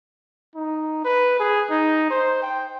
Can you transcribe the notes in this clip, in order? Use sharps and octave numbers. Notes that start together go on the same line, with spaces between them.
D#4
B4
G#4
D#4
C5
G5